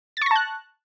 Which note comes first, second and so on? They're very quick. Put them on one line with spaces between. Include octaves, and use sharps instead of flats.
A6 C#6 A#6 A5 F#6